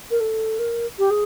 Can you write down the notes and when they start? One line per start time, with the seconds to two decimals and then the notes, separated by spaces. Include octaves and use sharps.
0.10 A#4
0.20 A4
0.59 A#4
0.98 G4
1.10 G#4